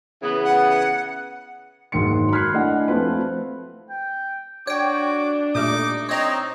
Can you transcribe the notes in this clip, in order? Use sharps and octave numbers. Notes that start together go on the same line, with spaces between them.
C#3 E3 B3
F#5
F#1 G#2 D#3 F#3 C6 C#7
B5 F6 F#6 G#6 C7
A3 D4 E4 D#5 F#5 G#5
F3 A3 C4 F4 B4
G5
D4 F#4 C#5 G5 D6
A#2 G3 A3 D#4 D6
C4 D#4 C#5 D#5 A#5